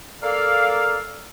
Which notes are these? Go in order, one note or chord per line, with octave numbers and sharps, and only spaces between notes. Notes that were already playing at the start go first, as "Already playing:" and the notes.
A#3 A4 D5 F5